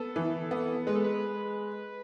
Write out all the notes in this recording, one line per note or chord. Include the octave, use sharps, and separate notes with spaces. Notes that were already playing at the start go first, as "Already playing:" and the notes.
Already playing: B3 A4
E3
B3
G#3 B4
A4
B4